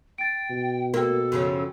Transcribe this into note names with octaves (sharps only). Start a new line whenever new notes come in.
G5 A6 D7
B2
A#3 F#4 A4 G5
F#2 C#3 F3